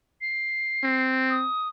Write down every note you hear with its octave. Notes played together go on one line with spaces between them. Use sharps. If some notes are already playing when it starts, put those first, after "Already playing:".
C7
C4
D#6